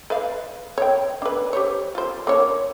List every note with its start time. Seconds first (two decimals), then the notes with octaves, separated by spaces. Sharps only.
0.10 B4 D5 F5
0.78 C#5 G5
1.22 D4 B4
1.53 G4 C5 C#5
1.95 F4 C5
2.27 A#3 D4 C#5